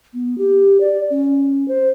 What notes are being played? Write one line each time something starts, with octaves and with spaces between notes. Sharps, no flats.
B3
G4
D5
C#4
C5